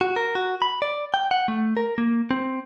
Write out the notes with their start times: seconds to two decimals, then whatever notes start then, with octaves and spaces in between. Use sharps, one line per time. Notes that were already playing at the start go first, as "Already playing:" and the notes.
0.01 F#4
0.16 A#4
0.35 F#4
0.62 B5
0.82 D5
1.14 G5
1.31 F#5
1.48 A3
1.77 A#4
1.98 A#3
2.31 C4